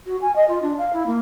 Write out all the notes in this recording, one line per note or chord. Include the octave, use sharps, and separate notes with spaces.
F#4
G#5
D#5
F4
D4
F5
E4
A#3